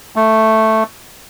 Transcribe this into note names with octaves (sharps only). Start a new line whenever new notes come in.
A3